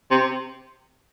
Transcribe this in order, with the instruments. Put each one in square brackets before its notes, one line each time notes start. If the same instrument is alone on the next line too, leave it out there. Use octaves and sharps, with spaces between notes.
[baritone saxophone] C3